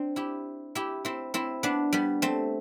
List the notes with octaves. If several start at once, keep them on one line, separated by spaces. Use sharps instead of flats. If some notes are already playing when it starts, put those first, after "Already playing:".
Already playing: C4 D4
E4 G4
E4 G4
C4 E4
C4 E4
B3 D4
G3 B3
A3 C4